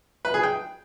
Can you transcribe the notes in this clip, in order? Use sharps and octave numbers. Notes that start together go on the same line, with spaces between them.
B4
G#4
G5